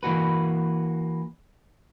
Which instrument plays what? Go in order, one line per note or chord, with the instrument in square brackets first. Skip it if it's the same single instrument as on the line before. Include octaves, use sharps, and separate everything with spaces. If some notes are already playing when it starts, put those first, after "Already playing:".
[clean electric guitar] E3 A#3 F#4 B4